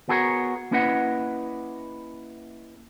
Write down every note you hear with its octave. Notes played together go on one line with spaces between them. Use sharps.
B3 F#4 G#4 A#4 C5 C#5
A#3 C#4 E4 B4 D#5 F#5